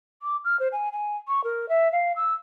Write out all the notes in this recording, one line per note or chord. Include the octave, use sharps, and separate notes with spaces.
D6
F6
C5
G#5
G#5
C#6
A#4
E5
F5
E6